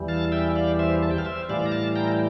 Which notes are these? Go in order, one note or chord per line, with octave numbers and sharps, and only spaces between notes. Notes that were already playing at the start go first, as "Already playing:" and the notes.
Already playing: E2 E3 G3
F5 A5
E5 G5
D5 F5
C5 E5
A5
G5
F5
C5 E5
A2 E3 G3 D5 F5
A#5
F5 A5
G5 A#5
G5